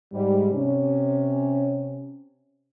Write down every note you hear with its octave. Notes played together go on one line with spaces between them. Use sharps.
G#2 G3
C3 C#4